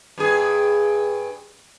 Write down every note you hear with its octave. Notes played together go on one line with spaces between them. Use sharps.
G2 G#4